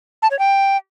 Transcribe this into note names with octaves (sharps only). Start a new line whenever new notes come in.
A5
C#5
G5